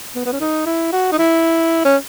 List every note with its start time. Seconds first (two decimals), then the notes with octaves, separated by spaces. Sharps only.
0.15 B3
0.26 B3
0.33 C#4
0.41 D#4
0.66 E4
0.92 F#4
1.12 D#4
1.18 E4
1.85 C#4